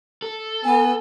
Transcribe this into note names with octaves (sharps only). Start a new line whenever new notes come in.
A4
B3 G#5